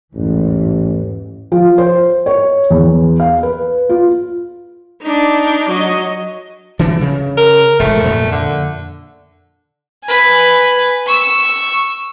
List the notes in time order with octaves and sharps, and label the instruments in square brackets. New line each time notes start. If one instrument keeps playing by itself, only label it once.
[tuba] A1 [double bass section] E2 G#2 E3
[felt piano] F3
C5
C#5
E2
F5
B4
F4
[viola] D4 D#4
F#3 D#5
[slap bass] E3 D4
C#3
[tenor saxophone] A#4
[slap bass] E1 G#2 [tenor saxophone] A3
[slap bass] F2 A#2
[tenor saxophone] D3
[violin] B4 G#5
C#6 E6